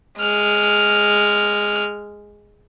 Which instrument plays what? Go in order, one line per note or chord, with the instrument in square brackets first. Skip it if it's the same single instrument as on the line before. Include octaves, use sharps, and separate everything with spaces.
[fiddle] G#3 F6